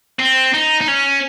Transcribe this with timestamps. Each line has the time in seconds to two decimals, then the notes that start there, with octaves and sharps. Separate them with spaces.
0.19 C4
0.54 D#4
0.81 D#4
0.88 C#4